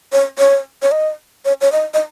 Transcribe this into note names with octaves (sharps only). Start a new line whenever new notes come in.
C#5
C#5
C#5
D#5
C#5
C#5
D#5
D#5